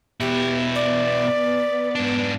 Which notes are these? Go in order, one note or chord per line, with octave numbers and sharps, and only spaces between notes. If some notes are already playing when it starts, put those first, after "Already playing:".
B2 B3 E4 G4 B4 A6
D5
G#2 D4